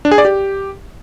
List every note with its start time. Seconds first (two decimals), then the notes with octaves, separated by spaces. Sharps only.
0.05 D4
0.11 G#4
0.18 D5
0.25 G4